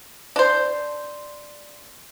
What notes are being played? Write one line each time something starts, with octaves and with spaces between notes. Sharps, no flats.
D4 C5